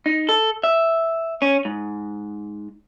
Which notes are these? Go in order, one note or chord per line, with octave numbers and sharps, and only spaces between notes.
D#4
A4
E5
C#4
G#2